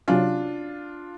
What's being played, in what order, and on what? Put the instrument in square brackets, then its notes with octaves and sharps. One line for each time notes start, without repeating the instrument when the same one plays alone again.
[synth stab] C3 F#3 C#4 [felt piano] D4 F4